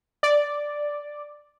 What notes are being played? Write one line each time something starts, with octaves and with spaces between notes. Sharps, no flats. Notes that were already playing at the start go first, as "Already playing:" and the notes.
D5